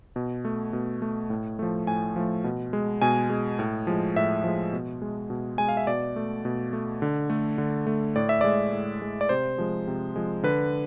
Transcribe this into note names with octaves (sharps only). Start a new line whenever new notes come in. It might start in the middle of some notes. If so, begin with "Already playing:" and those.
B2
A3
B2
A3
A2
F3 A3
A2 G#5
F3 A3
B2
G#3
B2 G#5
G#3
A2
F3 G#3
A2 E5
F3 G#3
B2
G#3
B2
G#3 G#5
F5
E5
B2 D5
A3
B2
A3
D3
A3
D3
A3
A2 D5
E5
G#3 D5
A2
G#3
D5
C3 C5
F3 G#3
C3
F3 G#3
D3 B4